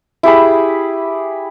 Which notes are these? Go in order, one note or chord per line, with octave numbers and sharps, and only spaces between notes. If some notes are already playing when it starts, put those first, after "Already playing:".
E4 G4 G#4 B5